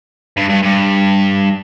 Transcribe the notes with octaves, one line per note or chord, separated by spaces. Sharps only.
G2
G2
G2